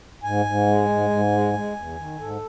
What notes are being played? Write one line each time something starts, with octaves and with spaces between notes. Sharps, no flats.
G#2 G#5
G#2
G#3
G#2
G#2
G#3
G#3
E2
D#3
G#2 A4